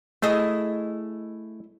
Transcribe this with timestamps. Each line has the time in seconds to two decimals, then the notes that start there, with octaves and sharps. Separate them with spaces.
0.22 A3 E4 G#4 D#5